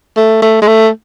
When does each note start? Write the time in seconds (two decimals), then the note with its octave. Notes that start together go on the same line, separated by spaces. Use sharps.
0.17 A3
0.42 A3
0.62 G#3
0.67 A3